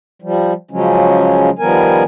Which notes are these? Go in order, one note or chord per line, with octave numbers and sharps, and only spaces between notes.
F3 G3
C#3 F3 F#3 G#3 C#4
D#3 F3 G3 B3 A#4 G#5